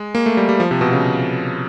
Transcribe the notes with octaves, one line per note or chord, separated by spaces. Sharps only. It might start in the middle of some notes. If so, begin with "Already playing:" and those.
Already playing: G#3
A#3
A3
G3
G3
F3
C3
B2
C#3